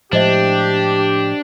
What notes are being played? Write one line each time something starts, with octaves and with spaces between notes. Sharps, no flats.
A2 F3 G#3 D4 G4 C5 D#5 E5